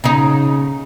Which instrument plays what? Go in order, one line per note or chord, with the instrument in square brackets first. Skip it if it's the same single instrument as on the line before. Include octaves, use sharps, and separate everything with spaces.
[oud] C#3 D#4